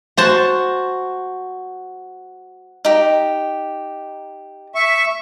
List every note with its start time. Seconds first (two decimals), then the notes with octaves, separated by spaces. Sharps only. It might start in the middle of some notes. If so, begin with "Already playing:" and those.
0.17 F#4 C5 A5
2.85 D#4 G4
4.75 E5 C#6